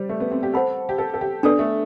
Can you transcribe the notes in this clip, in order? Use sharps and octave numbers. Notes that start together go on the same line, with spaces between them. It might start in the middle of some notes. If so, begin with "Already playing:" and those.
Already playing: G3 C5
A3
B3
C4
G4
A4 C5 F#5 B5
G4
A4
A4
G4
B3 D4 A4 D5
A3